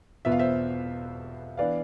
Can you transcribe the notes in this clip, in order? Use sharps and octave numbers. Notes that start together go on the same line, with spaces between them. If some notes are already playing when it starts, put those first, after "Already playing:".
E1 E2 B2 B3 F4 E5
F5
C5 E5
E3 B3 D4 D5 F5